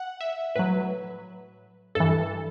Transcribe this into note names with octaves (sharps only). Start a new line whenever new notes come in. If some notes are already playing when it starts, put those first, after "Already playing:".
Already playing: F#5
E5
A2 F#3 B4
G2 E3 A4